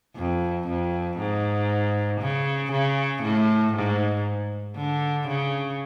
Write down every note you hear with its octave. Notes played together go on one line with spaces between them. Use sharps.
F2
F2
G#2
C#3
C#3
A2
G#2
D3
C#3